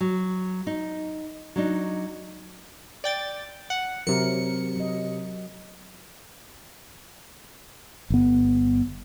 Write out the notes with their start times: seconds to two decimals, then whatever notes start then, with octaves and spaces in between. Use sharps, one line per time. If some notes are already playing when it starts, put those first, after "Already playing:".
0.01 F#3
0.67 D#4
1.56 F#3 D4 D#4
3.04 D5 G5 A6
3.70 F#5
4.07 C3 F#3 A#4 C#7
4.76 F#3 D#5
8.10 G1 B3